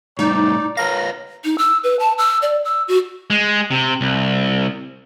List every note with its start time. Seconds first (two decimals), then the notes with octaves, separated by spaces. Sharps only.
0.19 A2 G3 D#4 D5
0.77 A#4 B4 C#5 F5 A#6
1.44 D#4
1.58 E6
1.83 B4
2.00 A5
2.18 E6
2.42 D5
2.65 E6
2.88 F#4
3.30 G#3
3.71 C3
4.01 C2